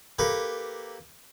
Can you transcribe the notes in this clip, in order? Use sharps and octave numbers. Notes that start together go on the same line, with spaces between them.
A#3 G4 A4 B4